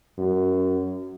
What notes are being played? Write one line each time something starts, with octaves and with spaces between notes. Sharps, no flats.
F#2